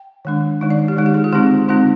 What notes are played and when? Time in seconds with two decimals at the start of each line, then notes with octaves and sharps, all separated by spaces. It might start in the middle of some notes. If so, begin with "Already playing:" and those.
Already playing: G5
0.25 D#3 G#3 D4
0.61 D#3 G#3 D#4
0.70 D5
0.88 G4
0.97 D#3 G#3 D#4
1.06 G4
1.14 G#4
1.24 F4
1.33 D3 G#3 C4 D#4 G4
1.68 D3 G#3 C4 D#4 F4